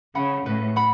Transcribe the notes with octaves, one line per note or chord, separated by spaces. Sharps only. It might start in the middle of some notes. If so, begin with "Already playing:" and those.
C#3 F#5 B5
A2 B4
F#5 B5